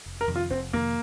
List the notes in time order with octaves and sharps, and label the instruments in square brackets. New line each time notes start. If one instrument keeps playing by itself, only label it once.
[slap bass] F1
[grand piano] A#4
[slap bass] F2 C3 D#3
[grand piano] F4
[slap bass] F1 [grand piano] C4
[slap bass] F2 C3 D#3 [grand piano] A#3